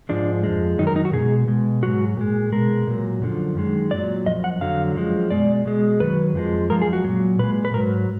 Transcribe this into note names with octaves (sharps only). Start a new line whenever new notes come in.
G#2 F3 G#3 D4
F2 F3 G#3
F#2 D#3 F#3 D#4
A#4
D#4
F#4
B2 G#3 G#4
B2 G#3
G#2 D#3 F#3 F#4
A#2 G#3
B2 G#3 A#4
A#2 F#3
F#2 D3 F3
F#2 D#3 G#3
A#2 F#3 D5
F#2 F3 D#5
F#5
F2 D3 F#3 F5
F#2 F3 G#3
B2 G#3 D5
B2 G#3
F#2 D#3 F#3 B4
F2 F3 G#3
F#2 F3 G#3 A#4
G#4
F#4
A#2 F#3
A#2 G#3 B4
B4
G#2 F#3 A#4